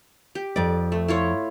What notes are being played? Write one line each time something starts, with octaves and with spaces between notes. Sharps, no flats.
G4
F2 D5
A3
E4 F4 C#5